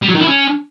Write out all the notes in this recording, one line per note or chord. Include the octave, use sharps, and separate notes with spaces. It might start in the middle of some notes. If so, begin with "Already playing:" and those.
G3
F#3
D#3
E4
C#4